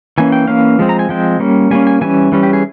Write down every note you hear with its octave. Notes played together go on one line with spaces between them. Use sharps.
E3 A#3 C#4 G#5
G5
E3 A#3 C#4 F5
F3 G#3 C4
A#5
G#5
F3 G#3 C4 G5
G3 A#3 C#4
G3 A#3 C#4 G#5
G#5
E3 G3 C#4 G#5
E3 G3 C#4
G4
G#4